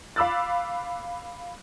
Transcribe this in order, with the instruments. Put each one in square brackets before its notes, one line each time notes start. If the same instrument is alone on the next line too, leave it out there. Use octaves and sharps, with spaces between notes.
[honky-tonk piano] F5 B5 D6 E6 F#6 A6